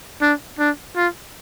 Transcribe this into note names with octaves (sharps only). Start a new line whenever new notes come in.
D4
D4
F4